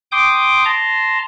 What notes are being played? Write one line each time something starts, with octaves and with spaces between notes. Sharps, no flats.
G5 C6 D6 D#6 G6
A5 A#5 C6